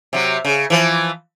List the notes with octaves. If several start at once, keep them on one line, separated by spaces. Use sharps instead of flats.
C3 F#3
C#3
E3 F3